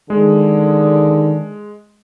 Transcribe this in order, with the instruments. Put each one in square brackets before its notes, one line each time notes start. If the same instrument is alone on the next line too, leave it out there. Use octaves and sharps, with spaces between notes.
[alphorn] D3 [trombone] D#3 [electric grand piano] G#3 [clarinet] G#4